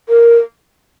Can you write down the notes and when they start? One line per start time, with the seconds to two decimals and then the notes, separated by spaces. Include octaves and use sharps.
0.09 A#4